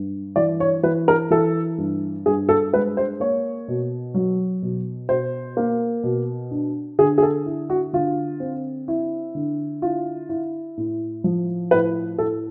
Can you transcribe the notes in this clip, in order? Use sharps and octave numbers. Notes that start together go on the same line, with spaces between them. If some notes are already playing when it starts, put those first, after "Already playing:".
Already playing: G2
E3 D5
C#5
E3 B4
A#4
E3 A4
G2
G2 G#4
A4
G#3 B4
C5
A#3 C#5
B2
F#3
B2
B2 C5
A#3
B2
D4
D3 G#4
G#4
A4
E4
F#4
D3 F4
C4
E4
D3
E4 F4
E4
A2
F3
A2 B4
A2 A4